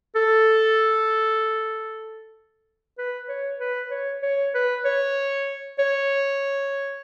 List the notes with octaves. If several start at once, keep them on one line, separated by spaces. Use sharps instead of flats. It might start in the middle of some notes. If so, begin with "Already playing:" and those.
A4
B4
C#5
B4
C#5
C#5
B4
C#5
C#5